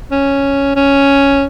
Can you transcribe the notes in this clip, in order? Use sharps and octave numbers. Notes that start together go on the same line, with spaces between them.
C#4
C#4